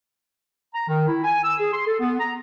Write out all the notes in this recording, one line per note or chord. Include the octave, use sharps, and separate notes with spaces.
A#5
D#3
E4
G#5
E6
G#4
C6
A4
B3
A#5